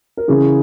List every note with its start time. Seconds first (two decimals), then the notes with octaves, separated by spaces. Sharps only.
0.17 A#4
0.28 C#3 E3 G#4